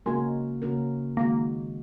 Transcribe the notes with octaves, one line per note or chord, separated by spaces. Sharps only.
C#3 G#3 A#3 C#4 F#4 A#4
C#3 A#3 C#4 F#4 A#4
D#3 G#3 A#3 F#4